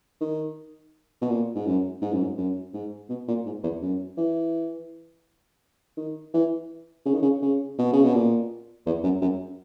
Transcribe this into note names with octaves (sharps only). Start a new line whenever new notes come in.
D#3
B2
A#2
G#2
F#2
G#2
F#2
G#2
F#2
G#2
B2
A#2
G#2
E2
F#2
E3
D#3
E3
C#3
D#3
C#3
C#3
B2
C#3
B2
A#2
E2
F#2
F#2